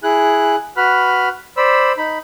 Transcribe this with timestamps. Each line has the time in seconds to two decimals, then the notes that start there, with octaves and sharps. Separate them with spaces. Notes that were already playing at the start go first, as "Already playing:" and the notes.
0.03 E4 G#4 F#6
0.77 F#4 B4 B5 F6
1.57 C5 D5 B5 E6
1.97 D#4 B5